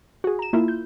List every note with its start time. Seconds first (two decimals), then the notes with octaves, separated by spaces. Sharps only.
0.24 F#4 G#4
0.39 A#5 E7
0.53 A#3 E4 F4
0.68 G6